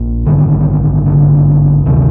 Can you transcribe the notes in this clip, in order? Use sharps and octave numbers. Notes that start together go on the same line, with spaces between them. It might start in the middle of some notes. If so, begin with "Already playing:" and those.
Already playing: A#1 A#2
A1 G2 D3 D#3
D3
D2 C3 D#3